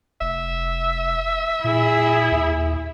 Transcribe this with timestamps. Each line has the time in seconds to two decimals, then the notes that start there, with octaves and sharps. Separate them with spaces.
0.21 F1 E5
1.64 A#2 E4 G#4
2.32 D#2